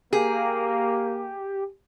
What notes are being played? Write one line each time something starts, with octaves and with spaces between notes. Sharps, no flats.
A#3 G4 G#4